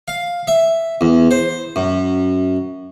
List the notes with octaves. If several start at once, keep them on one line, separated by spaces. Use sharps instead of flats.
F5
E5
E2
C5
F#2